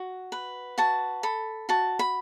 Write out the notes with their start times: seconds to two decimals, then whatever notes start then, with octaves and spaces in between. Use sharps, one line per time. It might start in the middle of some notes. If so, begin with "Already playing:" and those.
Already playing: F#4
0.32 B4
0.78 F#4 A5
1.23 A4 B5
1.69 F#4 A5
1.99 B5